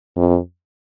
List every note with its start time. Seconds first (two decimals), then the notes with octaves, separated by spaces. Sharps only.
0.17 F2